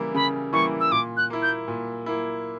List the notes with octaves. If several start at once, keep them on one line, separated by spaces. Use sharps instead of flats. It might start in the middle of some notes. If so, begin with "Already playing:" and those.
Already playing: C#3 E3 G3 A#3 E4
C#3 B5
E3 G3 A#3 E4 C#6
E6
A#2 D6
F#6
A#3 E4
G6
A#2
A#3 E4